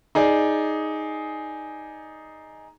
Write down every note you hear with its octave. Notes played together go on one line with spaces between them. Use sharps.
D#4 G#4 D5